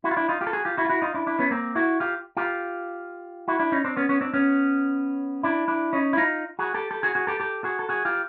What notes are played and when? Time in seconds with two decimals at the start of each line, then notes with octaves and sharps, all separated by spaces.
0.04 E4 F#4
0.11 F4
0.16 D4 E4
0.29 D#4 F4
0.41 F4 G4
0.47 A4
0.53 F#4 G#4
0.65 F4 G4
0.77 E4 F#4
0.85 F4
0.89 E4 F#4
1.02 D#4 F4
1.14 D4 E4
1.27 D4 E4
1.39 B3 C#4
1.51 A#3 C4
1.75 E4 F#4
2.00 F4 G4
2.37 F4 G4
3.48 E4 F#4
3.59 D4 E4
3.72 C#4 D#4
3.84 C4 D4
3.97 B3 C#4
4.09 B3 C#4
4.21 C4 D4
4.34 B3 C#4
5.43 D4 E4
5.68 D4 E4
5.93 C#4 D#4
6.13 E4
6.17 D#4 F4
6.59 F#4 G#4
6.74 G4 A4
6.91 G4 A4
7.03 F#4 G#4
7.15 F#4 G#4
7.27 G4 A4
7.40 G4 A4
7.64 F#4 G#4
7.79 A4
7.89 F#4 G#4
8.05 F4 G4